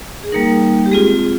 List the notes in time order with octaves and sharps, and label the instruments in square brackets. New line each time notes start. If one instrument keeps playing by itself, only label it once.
[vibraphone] G#4
G3 A#3 D#4 A#4
G4
G#3 C4 F4 G#4